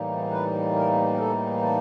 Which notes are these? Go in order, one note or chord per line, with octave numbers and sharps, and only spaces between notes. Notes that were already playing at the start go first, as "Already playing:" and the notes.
Already playing: A2 E3 G3 A#3 D#4
B4
A#4
A#4
A4
A4